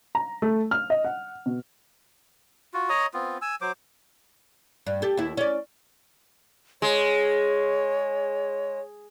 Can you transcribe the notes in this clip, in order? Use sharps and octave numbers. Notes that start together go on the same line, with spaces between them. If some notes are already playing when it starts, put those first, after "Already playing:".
A#5
A3
F6
D#5
F#5
B2
F4 F#4
C#5 D#5 A#5 D#6
B3 C4 F4
G#5 E6
F#3 C5 D6
G2
G4 A4
D#2 E4
C#4 D5
G#3 C#5